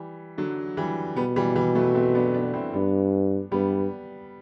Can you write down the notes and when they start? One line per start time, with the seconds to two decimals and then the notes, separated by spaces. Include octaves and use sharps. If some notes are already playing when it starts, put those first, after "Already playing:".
Already playing: E3 G3
0.38 D3 F#3
0.77 E3 G3
1.16 B2 G3 B3
1.36 E3 G3
1.56 E3 G3
1.75 F#3 A3
1.95 A3 C4
2.15 B3 D4
2.34 B3 D4
2.54 C4 E4
2.73 G2 B3 D4
3.52 G2 G3 B3